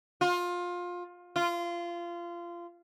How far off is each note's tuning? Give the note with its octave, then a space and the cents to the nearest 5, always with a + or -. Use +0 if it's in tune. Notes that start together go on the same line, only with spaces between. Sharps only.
F4 +20
F4 -20